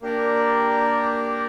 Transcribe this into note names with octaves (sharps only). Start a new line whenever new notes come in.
A#3 D4 G4 A#4 D5